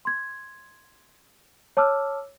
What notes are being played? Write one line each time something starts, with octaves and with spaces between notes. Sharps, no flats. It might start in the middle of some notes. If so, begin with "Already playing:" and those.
C6 G#6
C#5 A5 D6 E6 F6